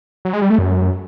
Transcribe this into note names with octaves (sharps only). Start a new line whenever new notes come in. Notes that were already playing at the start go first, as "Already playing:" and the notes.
F#3
G#3
G3
A3
F#2